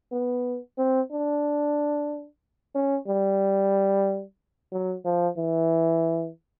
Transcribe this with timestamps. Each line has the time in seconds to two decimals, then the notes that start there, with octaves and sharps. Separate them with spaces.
0.12 B3
0.78 C4
1.11 D4
2.75 C#4
3.08 G3
4.72 F#3
5.05 F3
5.37 E3